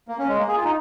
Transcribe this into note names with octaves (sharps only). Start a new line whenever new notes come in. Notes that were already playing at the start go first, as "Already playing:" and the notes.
A#3
C#4
G#3
A#3
G#4
F4
D#4